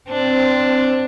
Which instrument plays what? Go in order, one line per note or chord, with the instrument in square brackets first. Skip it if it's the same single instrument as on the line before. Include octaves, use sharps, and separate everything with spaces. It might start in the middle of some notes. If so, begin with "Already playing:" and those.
[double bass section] C4 [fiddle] D4